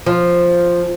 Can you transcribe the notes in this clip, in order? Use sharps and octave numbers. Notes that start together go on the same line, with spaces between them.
F3